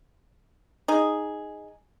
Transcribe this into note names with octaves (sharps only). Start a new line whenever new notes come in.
D#4 G#4